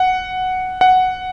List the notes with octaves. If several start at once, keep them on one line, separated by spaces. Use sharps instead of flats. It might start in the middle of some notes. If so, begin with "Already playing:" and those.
Already playing: F#5
F#5